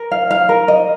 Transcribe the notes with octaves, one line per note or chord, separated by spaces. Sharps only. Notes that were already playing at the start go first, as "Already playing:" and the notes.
Already playing: A#4
F5
F5
A#4
D#5